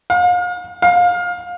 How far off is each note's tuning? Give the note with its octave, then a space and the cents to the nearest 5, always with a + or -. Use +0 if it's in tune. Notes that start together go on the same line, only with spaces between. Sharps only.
F5 +40
F5 +25